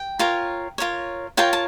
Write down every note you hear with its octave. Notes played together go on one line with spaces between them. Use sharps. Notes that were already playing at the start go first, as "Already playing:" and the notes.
Already playing: G5
F4 A#4 C#5
F4 A#4 C#5
F4 A#4 C#5 G5 A5
A5